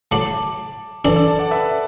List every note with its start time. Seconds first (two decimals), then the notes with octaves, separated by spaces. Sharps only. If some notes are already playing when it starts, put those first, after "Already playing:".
0.11 A2 F#3 A3 A5 D6
1.04 F#2 E3 D4 A4 D5
1.16 A4 D5
1.28 A5
1.39 D5 F#5
1.51 B4 E5